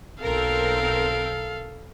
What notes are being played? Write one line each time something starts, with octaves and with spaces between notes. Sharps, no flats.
B1 C4 A4 A#4 F5